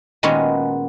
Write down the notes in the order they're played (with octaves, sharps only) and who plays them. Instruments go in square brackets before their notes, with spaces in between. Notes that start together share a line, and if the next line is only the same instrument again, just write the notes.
[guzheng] A#2 D#3 G#3 B3 C#4 F#4